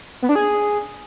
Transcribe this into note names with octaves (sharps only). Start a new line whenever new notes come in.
B3
D4
G#4